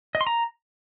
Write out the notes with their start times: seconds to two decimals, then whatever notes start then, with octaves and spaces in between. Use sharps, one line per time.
0.15 D#5
0.21 C6
0.27 A#5